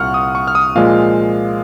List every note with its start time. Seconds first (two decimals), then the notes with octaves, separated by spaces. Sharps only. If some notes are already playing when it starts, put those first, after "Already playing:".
Already playing: C2 A#2 F5 F#5 C#6 F6
0.14 D#6
0.35 C#6
0.48 F6
0.55 D#6
0.75 A#2 F3 G#3 F5